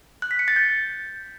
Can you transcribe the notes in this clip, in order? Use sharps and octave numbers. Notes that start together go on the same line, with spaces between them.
F#6
B6
C#7
A6
G6